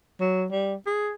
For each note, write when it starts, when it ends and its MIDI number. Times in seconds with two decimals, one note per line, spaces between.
0.20 0.46 54
0.51 0.75 55
0.86 1.13 68